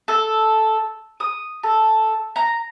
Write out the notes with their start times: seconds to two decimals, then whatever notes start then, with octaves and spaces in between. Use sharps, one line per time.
0.08 A4
1.20 D#6
1.64 A4
2.36 A#5